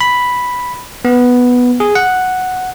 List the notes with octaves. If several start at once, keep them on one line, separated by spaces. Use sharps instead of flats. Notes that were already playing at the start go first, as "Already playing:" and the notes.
B5
B3
G#4
F#5